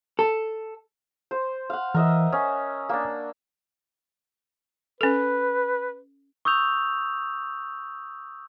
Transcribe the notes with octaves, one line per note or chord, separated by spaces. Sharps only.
A4
C5
F5 F#5
E3 A#4 D#5 E5
C#4 D#6
A#3 D4
C#4 A4 B4
C#6 D#6 E6 G6 F7